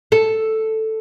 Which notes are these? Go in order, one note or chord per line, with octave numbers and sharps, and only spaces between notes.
A4